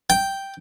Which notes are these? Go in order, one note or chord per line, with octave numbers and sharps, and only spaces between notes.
G5